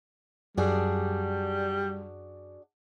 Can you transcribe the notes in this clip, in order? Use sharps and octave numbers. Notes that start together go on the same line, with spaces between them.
F#2 G3 D4 F#4 G#4